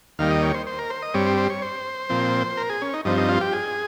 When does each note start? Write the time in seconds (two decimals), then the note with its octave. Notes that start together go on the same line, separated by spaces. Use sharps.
0.19 D#2 D#3 G3 A#3 F5
0.31 D#5
0.42 C#5
0.54 C5
0.66 C5
0.78 A#4
0.90 C5
1.02 D#5
1.14 G2 G3 C4 C#5
1.26 C5
1.37 C5
1.50 C#5
1.62 C5
2.09 A#2 F3 C4
2.57 A#4
2.70 G#4
2.82 C#4
2.94 D#4
3.05 G2 F3 C4 D#4
3.17 D#4
3.29 F4
3.41 G4
3.53 G#4